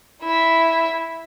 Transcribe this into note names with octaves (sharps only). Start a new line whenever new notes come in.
E4 E5